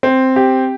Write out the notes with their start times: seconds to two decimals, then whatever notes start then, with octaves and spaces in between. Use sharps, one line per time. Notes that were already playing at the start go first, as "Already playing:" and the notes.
0.03 C4
0.36 G4